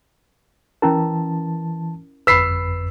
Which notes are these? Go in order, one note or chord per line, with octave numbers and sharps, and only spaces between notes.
E3 C#4 E4 A#4 A5
G1 F2 B4 B5 E6 B6 C7